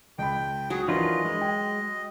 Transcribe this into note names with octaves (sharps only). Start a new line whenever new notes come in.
C#2 G5 B5
F#3 G#4
E3 F3 D4 F4 A#4 B4 D#5
G#3
G5